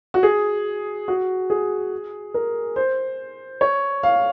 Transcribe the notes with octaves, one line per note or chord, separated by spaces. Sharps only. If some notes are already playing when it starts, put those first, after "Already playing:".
F#4
G#4
F#4
G#4
A#4
C5
C#5
F5